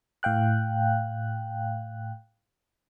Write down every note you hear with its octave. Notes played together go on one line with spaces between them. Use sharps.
A2 F5 G5 F#6